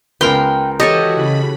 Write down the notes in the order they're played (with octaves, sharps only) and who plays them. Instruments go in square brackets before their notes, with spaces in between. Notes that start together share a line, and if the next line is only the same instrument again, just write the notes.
[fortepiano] C#2 B3 [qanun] A#4 C6 [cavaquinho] G5
[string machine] E3 F#4 [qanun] G4 A4 C#5 [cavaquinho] D#5
[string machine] C#3 B5